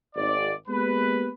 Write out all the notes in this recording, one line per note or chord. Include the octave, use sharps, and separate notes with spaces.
G#1 D5
G#3 A#3 B3 G4 B4